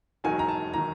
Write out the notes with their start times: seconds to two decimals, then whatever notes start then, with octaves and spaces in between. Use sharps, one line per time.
0.24 E1 D#2 D#3 F#3 G#5
0.39 A#5
0.48 A5
0.74 D#3 F#3 A#5